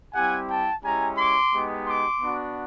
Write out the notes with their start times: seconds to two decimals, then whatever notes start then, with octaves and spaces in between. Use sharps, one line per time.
0.14 G3 C4 E4 G4 F#5 G#5
0.48 G5 A5
0.83 G#3 C#4 E4 G4 G#5 A#5
1.17 C6 D6
1.52 G#3 B3 D#4 G4
1.86 C6 D6
2.21 B3 D4 F#4